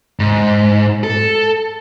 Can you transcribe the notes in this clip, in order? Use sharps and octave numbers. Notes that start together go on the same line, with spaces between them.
G#2
A4